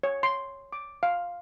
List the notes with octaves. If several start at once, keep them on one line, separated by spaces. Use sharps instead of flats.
C#5
C6
D6
F5